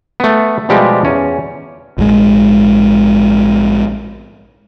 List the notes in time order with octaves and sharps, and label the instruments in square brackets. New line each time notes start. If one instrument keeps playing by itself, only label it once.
[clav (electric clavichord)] A3 B3
B2 F3 G3 G#3 G4
E2 C#4
[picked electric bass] A#1 G#2 D3 G#3